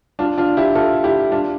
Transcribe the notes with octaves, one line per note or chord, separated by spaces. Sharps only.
D4 F4
D4 F4
E4 G4
F4 A4
E4 G4
D4 F4